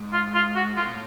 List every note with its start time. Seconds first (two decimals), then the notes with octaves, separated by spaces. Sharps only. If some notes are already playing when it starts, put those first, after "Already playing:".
Already playing: G#2
0.13 F4
0.34 F4
0.56 F#4
0.77 A2 F4
0.84 B2
0.91 A2